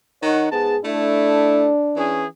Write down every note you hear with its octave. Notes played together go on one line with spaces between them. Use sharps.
D#3 D#4 C#5 F#5
G#2 B3 G#4 A5
A3 D4 E4
E3 C#4 G#4